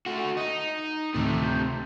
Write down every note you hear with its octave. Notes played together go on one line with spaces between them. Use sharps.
A3 F#4
D#4
D2 A2 C3 D#3 A3
A#5 G6